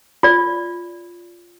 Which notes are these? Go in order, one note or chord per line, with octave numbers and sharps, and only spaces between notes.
F4 D5